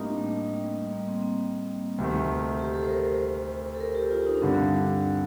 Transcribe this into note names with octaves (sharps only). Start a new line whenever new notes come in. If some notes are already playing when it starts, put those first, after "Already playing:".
Already playing: A2 G3 A#3 C4 D4 D#4
A3
A3
G3
G3
A#3
C4
C4
D2 C3 D#3 A3
G4
A4
C5
A#4
C5
A4
A#4
G4
F4
D#4
D4
G2 D3 G3 C4